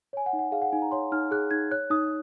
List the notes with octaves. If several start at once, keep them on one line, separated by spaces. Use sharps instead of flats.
C#5 G#5
F#5
D#4
F#5
G#4 F5
F#5
D#4 G#5
A#5
C#5 C6
D#4 F6
G#4 F#6
D#4 G#6
C#5 F#6
D#4 D#6